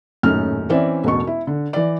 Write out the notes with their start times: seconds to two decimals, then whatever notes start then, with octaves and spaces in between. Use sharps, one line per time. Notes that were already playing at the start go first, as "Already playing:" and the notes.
0.23 D#1 F#2 A2 C#4 D#4 F6
0.70 E3 C4 C#4 D5 E5
1.04 E1 A1 B2 C#6
1.27 E4
1.47 D3
1.73 E3 D5